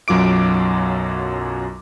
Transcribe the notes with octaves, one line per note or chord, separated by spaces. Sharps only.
B1 F#2 F#3 F4 D6 D7